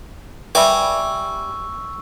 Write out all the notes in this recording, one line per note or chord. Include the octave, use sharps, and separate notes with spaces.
G3 B4 E5 G#5 B5 C#6 D6 E6